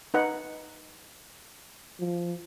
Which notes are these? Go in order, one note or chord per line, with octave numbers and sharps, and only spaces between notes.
D#4 B4 F#5
F3